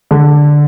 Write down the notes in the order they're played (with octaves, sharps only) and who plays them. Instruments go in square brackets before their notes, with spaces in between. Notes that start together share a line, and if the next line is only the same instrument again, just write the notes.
[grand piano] D3